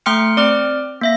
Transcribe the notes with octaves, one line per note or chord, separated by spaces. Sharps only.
A3 G5 C6 F6 C#7
C4 D5 G5 D6 F6
A#3 E5 A#6